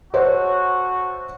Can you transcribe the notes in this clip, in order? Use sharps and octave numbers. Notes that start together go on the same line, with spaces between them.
A3 F#4 C5 C#5